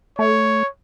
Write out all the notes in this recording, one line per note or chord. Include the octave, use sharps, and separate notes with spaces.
A3 C#5